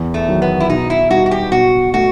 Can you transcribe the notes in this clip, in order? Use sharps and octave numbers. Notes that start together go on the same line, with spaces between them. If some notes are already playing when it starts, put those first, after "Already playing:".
Already playing: E2
A3
D#3 F#3
B3
E4
B2 D#4
E4
G3 D#4 F#4
F#4
G4
B2 F#4
A3 F#4